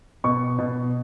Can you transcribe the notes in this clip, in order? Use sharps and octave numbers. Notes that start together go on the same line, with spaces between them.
B2 C#6
B2